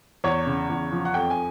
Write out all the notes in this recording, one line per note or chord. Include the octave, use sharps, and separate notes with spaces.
E2 C#5
C#3
E2
F3
F#5
F2 G5
G#5